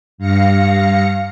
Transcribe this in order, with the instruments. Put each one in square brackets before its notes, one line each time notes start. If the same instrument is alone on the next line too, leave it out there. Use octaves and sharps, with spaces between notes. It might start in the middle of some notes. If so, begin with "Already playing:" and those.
[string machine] G2 F5 A#6 C#7